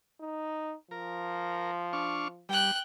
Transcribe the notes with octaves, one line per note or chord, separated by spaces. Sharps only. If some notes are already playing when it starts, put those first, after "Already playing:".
D#4
F3 A#4
D4 F5 C#6
G3 G5 F#6